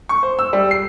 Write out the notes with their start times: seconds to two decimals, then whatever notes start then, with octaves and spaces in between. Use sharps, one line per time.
0.09 C#6
0.23 C5
0.39 E6
0.53 G3
0.71 C7